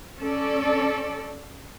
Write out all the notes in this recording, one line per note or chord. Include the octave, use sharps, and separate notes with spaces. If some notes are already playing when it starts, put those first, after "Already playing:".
C#4 A4 D5